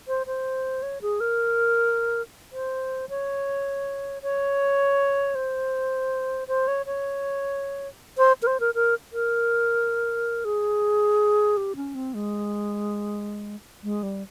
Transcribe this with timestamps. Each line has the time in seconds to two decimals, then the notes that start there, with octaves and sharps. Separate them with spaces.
0.08 C5
0.27 C5
0.83 C#5
1.02 G#4
1.20 A#4
2.52 C5
3.09 C#5
4.23 C#5
5.35 C5
6.48 C5
6.68 C#5
6.86 C#5
8.18 C5
8.42 A#4
8.47 C5
8.60 A#4
8.75 A#4
9.13 A#4
10.45 G#4
11.57 G4
11.76 C#4
11.95 C4
12.14 G#3
13.84 G#3
14.03 G3